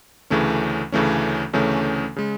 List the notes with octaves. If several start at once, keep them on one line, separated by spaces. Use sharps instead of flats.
D2 C#3 E3 A3 C#4
D2 C#3 E3 A3 C#4
D2 C#3 E3 A3 C#4
C#3 G#3